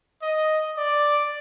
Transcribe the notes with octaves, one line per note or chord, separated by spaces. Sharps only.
D#5
D5